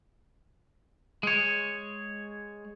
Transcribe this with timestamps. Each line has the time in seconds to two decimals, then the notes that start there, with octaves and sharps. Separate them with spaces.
1.23 G#3 C#5